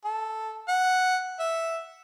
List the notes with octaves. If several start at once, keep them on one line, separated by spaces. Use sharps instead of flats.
A4
F#5
E5